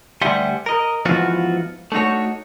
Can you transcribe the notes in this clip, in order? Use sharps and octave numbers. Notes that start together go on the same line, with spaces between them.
D2 G3 E5 F#5 G#5 C6
A#4 D#5
G#2 E3 F3 B3 F4 F#4
A3 D4 D#4 F#4 C#5